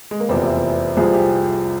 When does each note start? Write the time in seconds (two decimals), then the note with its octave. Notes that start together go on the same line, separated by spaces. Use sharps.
0.11 G#3
0.20 A#3
0.29 F1 E2 C3 F3 C4
0.46 E4
0.97 C2 C3 F3 G#4
1.14 G4